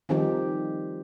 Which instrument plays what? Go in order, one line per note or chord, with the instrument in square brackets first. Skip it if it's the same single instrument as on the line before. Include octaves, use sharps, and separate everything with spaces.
[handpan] D#3 F3 G3 C4 D#4 G4